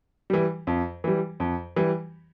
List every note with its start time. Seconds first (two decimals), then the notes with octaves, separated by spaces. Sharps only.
0.30 E3 G3
0.67 F2
1.04 E3 G3
1.40 F2
1.76 E3 G3